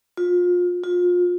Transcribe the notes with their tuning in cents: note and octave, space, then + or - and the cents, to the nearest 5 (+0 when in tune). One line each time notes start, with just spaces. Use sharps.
F4 +30
F4 +30